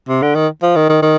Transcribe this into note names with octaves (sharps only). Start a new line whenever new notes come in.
C3
D3
D#3
F3
D#3
D#3
D#3